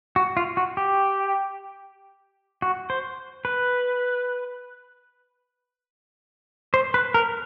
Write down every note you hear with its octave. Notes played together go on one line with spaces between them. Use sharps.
F#4
F4
F#4
G4
F#4
C5
B4
C5
B4
A#4